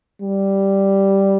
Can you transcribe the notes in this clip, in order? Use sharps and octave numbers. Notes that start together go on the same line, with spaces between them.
G3